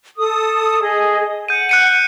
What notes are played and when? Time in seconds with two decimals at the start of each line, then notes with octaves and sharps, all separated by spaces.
0.17 A4 D#6
0.82 G#4 D#5
1.49 F#5 G6 D#7
1.69 F#6 C#7 D#7